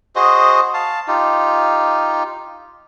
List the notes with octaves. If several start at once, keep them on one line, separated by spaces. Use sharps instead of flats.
F#4 G#4 C5 D#5
F5 A5
D#4 F4 G4